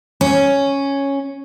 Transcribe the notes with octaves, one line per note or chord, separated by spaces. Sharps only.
C#4